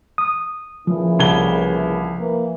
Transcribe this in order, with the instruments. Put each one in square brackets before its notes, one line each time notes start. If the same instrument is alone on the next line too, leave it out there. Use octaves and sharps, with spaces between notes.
[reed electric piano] D#6
[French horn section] A#2 C#3 E3 [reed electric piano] F3
[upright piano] C2 G#6 G7
[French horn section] E3 A#3